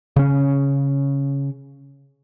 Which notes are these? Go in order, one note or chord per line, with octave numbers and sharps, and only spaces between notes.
C#3 C#4